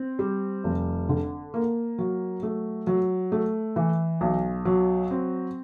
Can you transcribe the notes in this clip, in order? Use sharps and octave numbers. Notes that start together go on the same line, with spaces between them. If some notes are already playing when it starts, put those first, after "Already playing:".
Already playing: C4
G3
F1
D3
A#3
F#3
A3
F#3
A3
E3
B1
F#3
C4